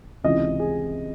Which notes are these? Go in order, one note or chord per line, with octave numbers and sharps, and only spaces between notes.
C#2 C3 E3 D#5
G#4